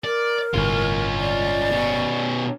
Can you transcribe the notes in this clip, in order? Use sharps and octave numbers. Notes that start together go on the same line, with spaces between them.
A#4 D5
G1 A2 C3 C#4 F4
D5
B2 C#4